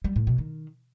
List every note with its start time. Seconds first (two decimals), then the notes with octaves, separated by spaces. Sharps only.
0.04 G3
0.16 A2
0.27 B2
0.38 D#3